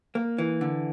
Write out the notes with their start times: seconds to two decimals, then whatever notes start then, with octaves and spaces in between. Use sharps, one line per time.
0.15 A#3
0.38 E3
0.61 D3